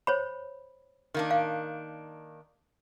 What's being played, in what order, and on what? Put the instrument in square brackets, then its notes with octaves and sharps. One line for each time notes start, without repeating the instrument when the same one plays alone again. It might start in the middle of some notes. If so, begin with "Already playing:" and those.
[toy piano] C5 C#5 B5
[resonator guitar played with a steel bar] D#3 A#3 D4
[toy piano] F5